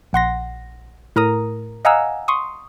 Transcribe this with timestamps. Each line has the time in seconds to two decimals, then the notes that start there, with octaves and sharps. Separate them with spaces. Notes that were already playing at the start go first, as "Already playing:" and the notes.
0.13 A#1 F#5 C6 A#6
1.16 A2 A#4 A#5 D#6
1.85 D#5 F5 F#5 G#5 A#5 E6
2.28 C6 C#6 D#6